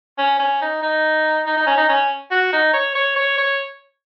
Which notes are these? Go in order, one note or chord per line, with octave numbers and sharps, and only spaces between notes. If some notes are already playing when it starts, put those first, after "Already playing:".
C#4
C#4
D#4
D#4
D#4
D#4
C#4
D#4
C#4
F#4
D#4
C#5
C#5
C#5
C#5